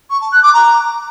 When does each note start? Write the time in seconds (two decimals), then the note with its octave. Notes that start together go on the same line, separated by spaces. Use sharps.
0.10 C#6
0.21 A5
0.32 F#6
0.43 D6
0.53 A#5